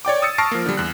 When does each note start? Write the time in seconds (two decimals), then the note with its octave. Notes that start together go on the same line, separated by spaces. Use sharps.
0.05 C#5 D5 G5 D6
0.22 D#6 E6 A6 C#7
0.38 A5 C#6 F6 A#6 C7 D7
0.52 F3 A#3
0.66 D3 G3
0.77 E2 F#6